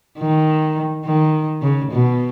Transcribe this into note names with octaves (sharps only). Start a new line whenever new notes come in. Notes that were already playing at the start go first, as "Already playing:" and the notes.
D#3
D#3
C#3
B2